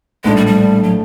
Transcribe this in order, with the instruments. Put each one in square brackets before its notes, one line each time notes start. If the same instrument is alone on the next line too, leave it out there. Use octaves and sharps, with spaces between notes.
[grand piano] A#1 A2 F3 A3 D4 [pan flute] G#3
[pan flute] G3
G3
F#3